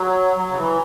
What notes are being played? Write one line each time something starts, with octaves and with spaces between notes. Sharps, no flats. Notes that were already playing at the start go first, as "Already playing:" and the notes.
Already playing: F#3
F#3
C#3
E3